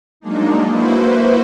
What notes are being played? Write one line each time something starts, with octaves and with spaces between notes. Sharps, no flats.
F#3 G#3 A#3 D4 D#4
A#3 E4 F#4 B4 C5